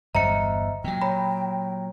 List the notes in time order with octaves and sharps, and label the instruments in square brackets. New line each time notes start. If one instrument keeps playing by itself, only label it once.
[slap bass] G1 E2 [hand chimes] C5 D#5 E5 [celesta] A#5 C#7
[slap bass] A#2 F#3 [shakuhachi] G5
[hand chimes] C#5 A#5 [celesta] B5